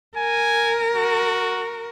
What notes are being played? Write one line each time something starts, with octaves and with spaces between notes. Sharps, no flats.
A#4 G#5
F#4